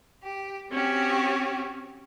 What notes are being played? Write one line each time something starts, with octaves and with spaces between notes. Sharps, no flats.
G4
C4 C#4 F#4 G4